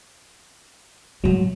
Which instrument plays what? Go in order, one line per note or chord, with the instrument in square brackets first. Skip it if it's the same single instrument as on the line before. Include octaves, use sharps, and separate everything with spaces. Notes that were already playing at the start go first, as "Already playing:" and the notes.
[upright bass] G#2 A3 [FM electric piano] F#3